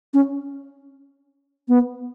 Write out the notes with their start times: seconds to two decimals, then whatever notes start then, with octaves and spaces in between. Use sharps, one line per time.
0.14 C#4
1.68 B3